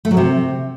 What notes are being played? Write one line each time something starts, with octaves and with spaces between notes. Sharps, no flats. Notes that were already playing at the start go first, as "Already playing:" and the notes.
A3
F#3
C3